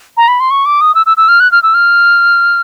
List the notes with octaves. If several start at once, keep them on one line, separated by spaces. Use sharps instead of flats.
A#5
B5
C6
C#6
D6
D#6
E6
E6
E6
F6
F#6
F6
E6
F6